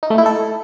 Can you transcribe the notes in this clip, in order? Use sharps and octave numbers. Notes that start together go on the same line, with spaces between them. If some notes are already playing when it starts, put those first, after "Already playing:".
D#4
A3
E4
A4